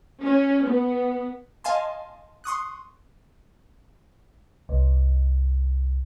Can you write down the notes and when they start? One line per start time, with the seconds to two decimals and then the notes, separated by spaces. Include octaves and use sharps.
0.22 C#4
0.67 B3
1.64 D#5 F5 G#5 A5 C6
2.44 C6 C#6 D#6 F#6
4.69 C2